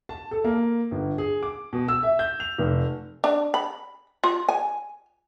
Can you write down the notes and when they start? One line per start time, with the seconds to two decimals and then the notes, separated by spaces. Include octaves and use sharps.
0.09 A5
0.31 A4
0.44 A#3
0.91 G1
1.18 G#4
1.43 D6
1.73 B2
1.88 E6
2.03 E5
2.19 G6
2.40 F7
2.58 F1
3.24 D4
3.54 B5
4.24 F4
4.49 G#5